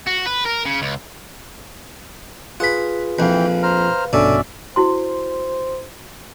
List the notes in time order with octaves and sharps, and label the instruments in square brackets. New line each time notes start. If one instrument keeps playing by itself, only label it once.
[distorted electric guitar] F#4
B4
A#4
C#3
C#2
[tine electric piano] F4 G#4 B4 [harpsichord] F#5 B5
[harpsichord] A#1 F2 [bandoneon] E3 G5 [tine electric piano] B4 F5
[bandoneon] C5 A#5 F6
[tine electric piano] A#1 G2 B2 [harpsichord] D3 [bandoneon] C#4 D5 E5
[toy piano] E4 F#4 C6 [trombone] C5